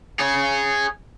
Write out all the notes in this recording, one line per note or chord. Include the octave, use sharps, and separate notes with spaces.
G#4 C#5